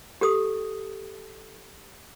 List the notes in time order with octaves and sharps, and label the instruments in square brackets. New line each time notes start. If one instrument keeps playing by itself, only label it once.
[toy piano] G4 A4 D#6